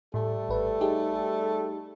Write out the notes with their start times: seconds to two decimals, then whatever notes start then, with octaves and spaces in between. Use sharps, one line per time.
0.14 A2 G3 A3 A4
0.49 G#1 B4
0.81 D#4 G4 G#4